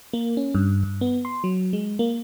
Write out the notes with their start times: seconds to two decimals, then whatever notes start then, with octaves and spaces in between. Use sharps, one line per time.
0.13 A#3
0.37 C#4
0.55 G2
0.83 G2
1.01 B3
1.25 C6
1.44 F#3
1.73 G#3
1.99 A#3